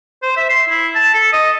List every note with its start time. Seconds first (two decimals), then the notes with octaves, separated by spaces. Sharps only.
0.23 C5
0.37 E5
0.50 C6
0.69 E4
0.95 A5
1.14 A4
1.33 D#5